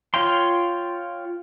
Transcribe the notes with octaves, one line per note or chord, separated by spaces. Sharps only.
F4 C#5 F5 G5 C6